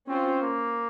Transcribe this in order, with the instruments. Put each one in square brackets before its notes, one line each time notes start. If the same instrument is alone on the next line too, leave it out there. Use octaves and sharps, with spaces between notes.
[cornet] C4 [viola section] C#4 F4 C5
[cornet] A#3